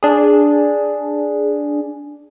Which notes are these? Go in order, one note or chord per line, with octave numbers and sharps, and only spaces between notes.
D4 G#4